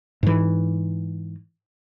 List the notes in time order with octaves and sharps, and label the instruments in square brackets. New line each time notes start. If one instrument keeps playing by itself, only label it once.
[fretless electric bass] G#2 E3